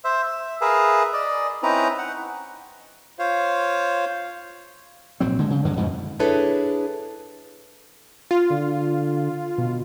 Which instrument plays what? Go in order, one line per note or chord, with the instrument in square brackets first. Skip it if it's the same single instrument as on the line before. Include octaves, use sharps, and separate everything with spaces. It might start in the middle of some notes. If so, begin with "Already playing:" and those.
[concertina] C5 E5
E5
G#4 A#4 B4 E5 F5
D5 D#5
C4 C#4 D#4 E4 B4 A#5
F#5
[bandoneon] F4 C5 C#5 F5
[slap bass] A#1 G#2 F#3 C4
D3 G#3
C#3
G2 D3 F#3 G#3
F2 G#2 B2 F3
[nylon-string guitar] D4 E4 G#4 A4 B4 C#5
[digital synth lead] F4
[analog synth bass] D3
B2